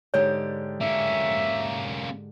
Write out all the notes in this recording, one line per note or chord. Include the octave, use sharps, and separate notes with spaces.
G#2 D3 G4 C#5
A#3 C#4 E5